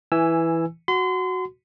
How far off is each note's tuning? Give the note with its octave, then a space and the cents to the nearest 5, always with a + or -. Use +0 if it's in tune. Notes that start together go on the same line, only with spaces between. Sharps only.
E3 +0 G#5 +0 E6 +10
F#4 +0 C6 -35